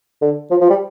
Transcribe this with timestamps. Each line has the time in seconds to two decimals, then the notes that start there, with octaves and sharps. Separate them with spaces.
0.21 D3
0.51 F3
0.61 F3
0.70 G3